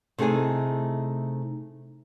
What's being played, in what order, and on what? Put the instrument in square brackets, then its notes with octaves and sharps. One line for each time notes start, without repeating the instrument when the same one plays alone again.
[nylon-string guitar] C3 A3 D#4 E4 G#4 G#5